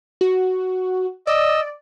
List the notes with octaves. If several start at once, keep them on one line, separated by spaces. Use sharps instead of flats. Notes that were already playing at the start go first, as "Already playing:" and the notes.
F#4
D5 D#5 E6